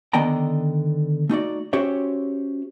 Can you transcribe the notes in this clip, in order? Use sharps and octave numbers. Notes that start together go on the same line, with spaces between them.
D3 D#3 B3 D5 G5 A#5
A3 D#4 F#4 D5
C#4 F#4 G4 C5 C#5 E5